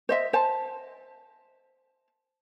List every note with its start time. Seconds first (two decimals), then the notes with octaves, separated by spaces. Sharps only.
0.09 C5 D#5 E5
0.33 C5 A5